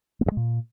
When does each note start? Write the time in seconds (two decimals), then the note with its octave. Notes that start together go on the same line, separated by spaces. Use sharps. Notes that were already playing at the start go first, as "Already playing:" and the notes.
0.21 A#3
0.26 G2
0.31 G#3
0.37 A#2